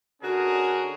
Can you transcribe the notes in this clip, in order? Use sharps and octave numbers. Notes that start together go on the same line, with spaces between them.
D3 C#4 D4 F#4 G#4 A#4